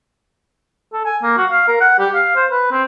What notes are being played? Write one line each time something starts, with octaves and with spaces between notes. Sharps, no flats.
A4
G#5
A#3
F#4
F5
A#4
F#5
G4
F5
C5
B4
C4